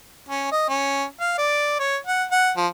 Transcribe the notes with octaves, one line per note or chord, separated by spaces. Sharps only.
C#4
D#5
C#4
F5
D5
C#5
F#5
F#5
F3